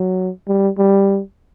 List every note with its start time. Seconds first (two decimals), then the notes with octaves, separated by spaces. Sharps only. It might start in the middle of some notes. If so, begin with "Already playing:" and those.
Already playing: F#3
0.48 G3
0.78 G3